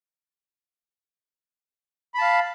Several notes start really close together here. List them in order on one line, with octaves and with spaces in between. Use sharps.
B5 A5 F5